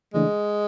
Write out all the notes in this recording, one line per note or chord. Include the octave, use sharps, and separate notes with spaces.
C#3 E3 G#3 A3 D4